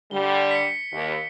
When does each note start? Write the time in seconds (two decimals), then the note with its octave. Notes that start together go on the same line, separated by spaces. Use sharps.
0.11 D3 G3 G7
0.51 B6 C#7
0.92 D#2